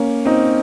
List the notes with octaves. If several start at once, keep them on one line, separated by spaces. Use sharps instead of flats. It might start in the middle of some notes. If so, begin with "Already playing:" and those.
Already playing: A#3 C#4
C4 D#4